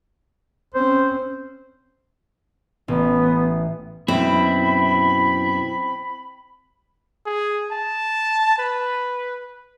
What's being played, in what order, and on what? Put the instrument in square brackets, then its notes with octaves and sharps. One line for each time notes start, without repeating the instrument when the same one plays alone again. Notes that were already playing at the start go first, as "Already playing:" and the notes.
[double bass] C4 C#4 [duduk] C5
[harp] A1 [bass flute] B3
[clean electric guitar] F#2 B2 [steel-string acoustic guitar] C4 [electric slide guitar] E4 [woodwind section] B5
[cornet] G#4
A5
B4